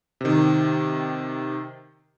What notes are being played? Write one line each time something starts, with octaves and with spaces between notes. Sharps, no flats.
C3 D#3